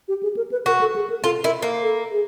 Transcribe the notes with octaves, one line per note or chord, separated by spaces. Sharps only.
G4
G#4
A#4
B4
F#4 A#4
A4
G#4
A#4
F4 A4
E4 A#4
A#3 A#4
A4
G#4